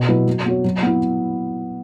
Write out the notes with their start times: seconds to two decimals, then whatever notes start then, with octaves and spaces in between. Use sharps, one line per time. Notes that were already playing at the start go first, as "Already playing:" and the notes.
Already playing: B2
0.08 F#3 B3 E4 B4
0.27 F#3
0.46 B3 F#4 C#5
0.64 F#3
0.82 B3 E4